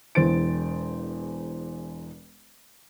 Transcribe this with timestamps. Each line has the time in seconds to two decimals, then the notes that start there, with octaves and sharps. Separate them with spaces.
0.15 E1 E2 C5 A6 D7